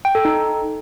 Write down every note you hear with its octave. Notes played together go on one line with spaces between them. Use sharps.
G5
A4
D#4